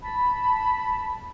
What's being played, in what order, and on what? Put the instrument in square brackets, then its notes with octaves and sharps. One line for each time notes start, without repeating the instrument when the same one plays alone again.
[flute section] A5 B5